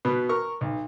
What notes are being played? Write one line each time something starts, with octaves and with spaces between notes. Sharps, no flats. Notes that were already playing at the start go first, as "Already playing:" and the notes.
B2 B3
A#4 C#6
B1